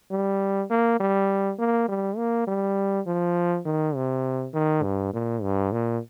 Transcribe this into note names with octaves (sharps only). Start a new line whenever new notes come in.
G3
A#3
G3
A#3
G3
A#3
G3
F3
D#3
C3
D#3
G2
A#2
G2
A#2